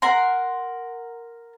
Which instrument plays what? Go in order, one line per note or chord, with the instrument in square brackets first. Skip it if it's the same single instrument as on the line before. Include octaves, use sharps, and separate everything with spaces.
[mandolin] A#4 F#5 C6